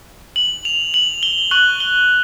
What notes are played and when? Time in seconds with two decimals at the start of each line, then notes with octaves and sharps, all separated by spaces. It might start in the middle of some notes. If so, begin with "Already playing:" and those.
0.36 F#7
0.65 F7
0.94 F#7
1.23 G7
1.51 C#6 F#6 F#7
1.80 G7